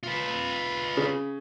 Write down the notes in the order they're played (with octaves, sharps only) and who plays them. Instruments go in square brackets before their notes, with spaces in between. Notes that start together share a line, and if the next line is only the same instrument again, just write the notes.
[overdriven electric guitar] F4 B4
[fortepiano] C#3